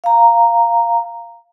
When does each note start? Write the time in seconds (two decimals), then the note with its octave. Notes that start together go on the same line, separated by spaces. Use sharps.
0.04 F5 A#5